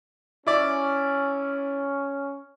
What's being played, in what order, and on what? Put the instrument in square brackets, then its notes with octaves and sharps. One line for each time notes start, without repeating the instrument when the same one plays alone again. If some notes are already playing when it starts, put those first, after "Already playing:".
[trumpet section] C#4 [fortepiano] E4 D5